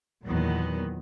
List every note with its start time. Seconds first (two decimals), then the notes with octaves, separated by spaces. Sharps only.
0.24 E2 A#2 D#3 F#3 B3